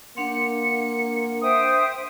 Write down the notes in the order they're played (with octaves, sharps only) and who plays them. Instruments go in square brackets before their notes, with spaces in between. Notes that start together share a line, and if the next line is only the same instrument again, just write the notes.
[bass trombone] A#3 [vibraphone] D4 F#5 C6 [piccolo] C#7
[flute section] C5 E5 G5 [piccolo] D#6